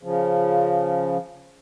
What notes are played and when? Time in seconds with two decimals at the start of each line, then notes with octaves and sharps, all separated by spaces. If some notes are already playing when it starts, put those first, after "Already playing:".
0.03 C#3 F3